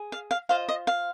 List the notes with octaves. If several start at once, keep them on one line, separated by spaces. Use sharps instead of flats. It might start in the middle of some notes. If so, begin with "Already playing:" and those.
Already playing: G#4
F5
F5
F4 C5 D#5 F5
D#5
F5